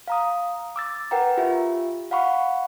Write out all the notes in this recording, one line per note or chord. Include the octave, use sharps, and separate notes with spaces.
F5 A#5 D#6
D6 E6 A6
A#4 B4 F#5 G5 A#5
F4 G4 E5
F5 F#5 B5 C#6